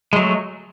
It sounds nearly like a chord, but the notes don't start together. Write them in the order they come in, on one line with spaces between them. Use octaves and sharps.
G#3 F#3 A3